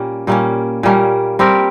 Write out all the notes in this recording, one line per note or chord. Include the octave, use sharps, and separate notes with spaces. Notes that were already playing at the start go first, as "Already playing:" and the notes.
Already playing: A#2 G3 A#3 C#4
A#2 G3 A#3 C#4
A#2 G3 A#3 C#4
G3 C4 G4 A#4